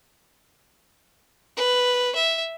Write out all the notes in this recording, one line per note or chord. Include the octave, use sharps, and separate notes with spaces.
B4
E5